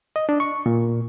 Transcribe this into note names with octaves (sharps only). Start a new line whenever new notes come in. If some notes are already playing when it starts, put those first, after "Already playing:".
D#5
D4
C#6
A#2